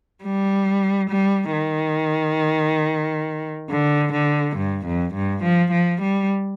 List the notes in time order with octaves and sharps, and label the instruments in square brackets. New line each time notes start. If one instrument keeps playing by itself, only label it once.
[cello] G3
G3
D#3
D3
D3
G2
F2
G2
F3
F3
G3